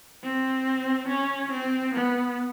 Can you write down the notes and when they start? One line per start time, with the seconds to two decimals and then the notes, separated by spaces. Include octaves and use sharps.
0.23 C4
1.08 C#4
1.50 C4
1.93 B3